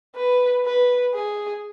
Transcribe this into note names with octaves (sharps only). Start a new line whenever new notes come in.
B4
B4
G#4